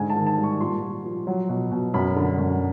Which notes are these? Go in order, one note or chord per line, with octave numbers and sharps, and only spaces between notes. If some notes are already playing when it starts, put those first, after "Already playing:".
Already playing: G#2 D3 G#5
A5
D#3
A5
G3
C#6
A#2 C6
A#2
F3
F#3
B2
B2
F#2 B5
D3
F#2